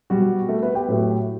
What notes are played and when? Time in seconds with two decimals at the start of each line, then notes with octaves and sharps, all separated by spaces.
0.10 B2 G3 F#4
0.49 A3 A4
0.62 B3 B4
0.75 G4 G5
0.88 A2 F#3 A3